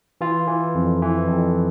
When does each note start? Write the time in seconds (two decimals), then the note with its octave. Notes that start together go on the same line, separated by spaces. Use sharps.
0.21 E3 F4
0.47 E3
0.75 F2
1.02 E3
1.28 F2